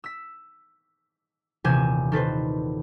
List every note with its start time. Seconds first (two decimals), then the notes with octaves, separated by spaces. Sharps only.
0.04 E6 B6
1.64 D#1 C3 E3 G#5 G6 E7
2.12 D#3 A4 B4 C5